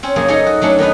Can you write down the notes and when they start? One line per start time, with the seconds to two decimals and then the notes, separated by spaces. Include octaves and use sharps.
0.03 C4 C#4
0.16 F#2 C#3 A#3 G#4
0.28 D#4 G#4 A4 C#5 D#5
0.46 F#4
0.61 F#3 A3 C#4 D4
0.79 D#3 B3 D#4 B4